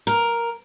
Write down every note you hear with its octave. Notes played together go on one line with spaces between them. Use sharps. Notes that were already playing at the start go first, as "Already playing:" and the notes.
A#4